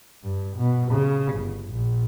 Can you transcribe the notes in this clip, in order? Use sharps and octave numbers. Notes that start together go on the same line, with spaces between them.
G2
B2
C#3
G1
A#1